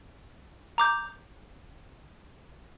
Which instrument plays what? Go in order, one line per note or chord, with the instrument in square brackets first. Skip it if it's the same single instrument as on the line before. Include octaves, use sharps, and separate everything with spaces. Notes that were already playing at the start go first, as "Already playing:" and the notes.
[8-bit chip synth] A#5 D6 G6